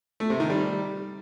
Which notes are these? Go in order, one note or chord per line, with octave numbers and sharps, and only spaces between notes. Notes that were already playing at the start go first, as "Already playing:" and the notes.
A3
C3
D#3
G3